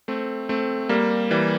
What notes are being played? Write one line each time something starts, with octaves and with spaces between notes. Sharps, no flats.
A3 C4
A3 C4
G3 A#3
E3 G3